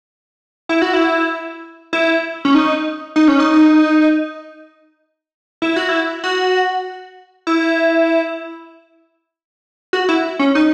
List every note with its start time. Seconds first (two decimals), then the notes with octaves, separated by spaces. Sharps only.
0.69 E4
0.82 F#4
0.93 E4
1.93 E4
2.45 C#4
2.54 D#4
3.16 D#4
3.28 C#4
3.40 D#4
5.62 E4
5.76 F#4
5.89 E4
6.24 F#4
7.47 E4
9.93 F#4
10.09 E4
10.39 C#4
10.55 D#4